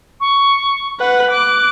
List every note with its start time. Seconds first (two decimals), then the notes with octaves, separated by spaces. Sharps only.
0.20 C#6
1.00 B4 F#5
1.31 D6 F#6